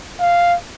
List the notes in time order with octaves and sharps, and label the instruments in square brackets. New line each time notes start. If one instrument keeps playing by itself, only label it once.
[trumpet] F5